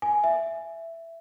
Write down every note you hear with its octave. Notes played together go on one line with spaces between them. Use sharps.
G#5
E5